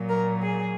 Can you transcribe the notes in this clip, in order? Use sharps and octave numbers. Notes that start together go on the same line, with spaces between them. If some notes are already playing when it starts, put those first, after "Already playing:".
Already playing: A#2 F#3
A#4
G#4